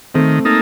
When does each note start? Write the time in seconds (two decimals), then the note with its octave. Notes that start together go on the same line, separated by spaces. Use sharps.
0.14 D#3 A3 C4
0.45 A#3 D#4 A4